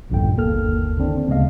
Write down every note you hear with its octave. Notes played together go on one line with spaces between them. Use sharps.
A#1 E2 G2 A#2 D3 G5
G1 D#2 A#3 A4 F6
D3 D#3 C4 D4
D2 C#3 G#3 B3 D#5 F5